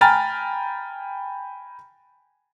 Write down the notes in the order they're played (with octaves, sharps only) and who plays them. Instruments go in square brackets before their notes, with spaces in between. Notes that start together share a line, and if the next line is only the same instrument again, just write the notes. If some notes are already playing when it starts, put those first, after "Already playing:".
[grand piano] G5 G#5 A#5 B5 F6 A6